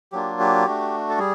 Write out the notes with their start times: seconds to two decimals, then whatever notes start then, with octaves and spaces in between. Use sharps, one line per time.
0.12 F#3 A#3 D4 F4 G4
0.40 G4
0.66 A3 D4 F#4
1.09 A4
1.19 G3 G#4